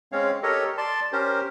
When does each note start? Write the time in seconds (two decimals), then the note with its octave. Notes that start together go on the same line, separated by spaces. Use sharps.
0.12 G#3 C4 C#4 C#5 F5
0.43 G4 A4 A#4 C#5 D#5
0.78 D5 A5 C6
1.13 C#4 G4 A#4 C5